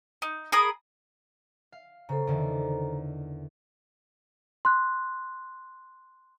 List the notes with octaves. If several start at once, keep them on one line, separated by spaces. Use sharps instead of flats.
D#4
G#4 A#4 B5 D#6
F5
C#3 A4 C5 A#5
E2 D3 D#3
C6 F#6